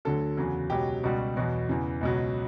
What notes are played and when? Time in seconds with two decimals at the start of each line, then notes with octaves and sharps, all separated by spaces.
0.05 D2 D3 F#3 A4
0.37 E2 C#3 F#3
0.70 C#2 B2 F#3 G4
1.03 C#2 B2 G3 F#4
1.36 E2 B2 F#3
1.69 E2 C#3 E3
2.01 C#2 B2 F#3